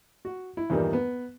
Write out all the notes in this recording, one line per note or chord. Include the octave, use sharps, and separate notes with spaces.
F#4
E4
E2 G2 A#2 D#3 G3
B3